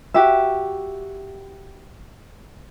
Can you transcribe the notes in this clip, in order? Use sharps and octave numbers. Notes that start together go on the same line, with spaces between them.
F#4 G4 E5